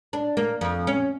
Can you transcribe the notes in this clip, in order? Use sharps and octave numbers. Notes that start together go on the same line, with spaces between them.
D4
A#3
F2
C#4